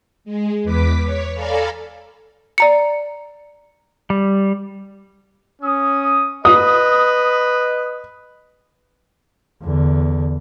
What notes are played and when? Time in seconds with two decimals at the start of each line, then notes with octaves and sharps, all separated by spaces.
0.24 G#3
0.63 E2 B4 D6 B6
1.03 C#5
1.34 A4 D5 F5 G#5 A#5 B5
2.58 D5 A#5 C#7
4.10 G3
5.62 C#4 D#6
6.45 B4 D#5 D#6
9.63 E2 D3